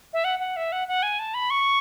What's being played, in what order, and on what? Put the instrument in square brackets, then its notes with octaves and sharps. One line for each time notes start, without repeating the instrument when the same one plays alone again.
[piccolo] E5
F#5
F#5
E5
F#5
F#5
G#5
A5
B5
C#6